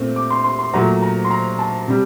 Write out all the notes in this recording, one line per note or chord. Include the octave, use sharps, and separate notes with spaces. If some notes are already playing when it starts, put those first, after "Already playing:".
Already playing: A#2 A3 C4
D6
C6
C6
C6
A#2 F#3 A3 A#5
A#5
C6
A#5
A5
C3 G3